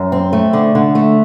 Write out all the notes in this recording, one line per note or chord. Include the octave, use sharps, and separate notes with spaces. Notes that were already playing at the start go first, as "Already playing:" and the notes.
Already playing: F#2
C4
A3
D3
D3
A3